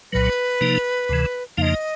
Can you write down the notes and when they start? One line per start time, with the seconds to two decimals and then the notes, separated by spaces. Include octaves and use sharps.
0.12 C2 A#2 F#3 B4
0.61 C3 F3 A#3 D#4
1.09 D2 C3 E3
1.57 F2 C#3 F3 A#3 D#4 D#5 F5